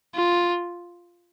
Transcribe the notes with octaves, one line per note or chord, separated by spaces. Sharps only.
F4